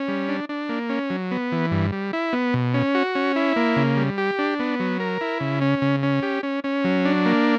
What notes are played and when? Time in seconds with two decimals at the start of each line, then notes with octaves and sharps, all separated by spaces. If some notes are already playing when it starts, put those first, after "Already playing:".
Already playing: C#4
0.08 G3
0.29 D4
0.49 D4
0.69 A#3
0.89 C#4
1.10 F#3
1.31 B3
1.52 E3
1.71 G2
1.92 G3
2.13 E4
2.33 B3
2.54 B2
2.74 C#4
2.95 F#4
3.15 C#4
3.36 E4
3.56 A#3
3.76 C#3
3.97 G3
4.18 G4
4.39 D4
4.60 B3
4.80 F#3
5.00 A#4
5.21 E4
5.40 C#3
5.61 C#4
5.82 C#3
6.03 C#4
6.22 G4
6.43 C#4
6.64 C#4
6.84 F#3
7.05 D4
7.26 A#3